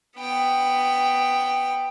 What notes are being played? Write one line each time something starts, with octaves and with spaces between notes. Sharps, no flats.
B3 G5